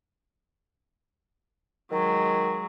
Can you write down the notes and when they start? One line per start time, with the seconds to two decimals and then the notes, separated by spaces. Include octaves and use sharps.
1.91 D#3 F#3 G#3